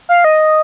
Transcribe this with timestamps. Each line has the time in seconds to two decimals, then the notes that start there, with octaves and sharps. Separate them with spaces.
0.09 F5
0.24 D#5